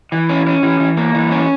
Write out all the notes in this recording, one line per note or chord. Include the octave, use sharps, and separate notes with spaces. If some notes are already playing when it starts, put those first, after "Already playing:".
E3
C#4
C#4
E3
E3
A#3
E3
C#4